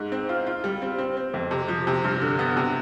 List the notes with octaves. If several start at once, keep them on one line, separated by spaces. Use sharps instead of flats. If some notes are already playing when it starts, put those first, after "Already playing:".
Already playing: G#2
C4
F4
F4
G3
C4
C4
C4
F2
C3
F3
C3
G2
D3
B3
C3